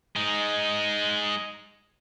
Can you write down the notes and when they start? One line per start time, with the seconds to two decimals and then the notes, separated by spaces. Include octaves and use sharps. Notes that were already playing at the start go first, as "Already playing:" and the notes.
0.16 G#3 D#4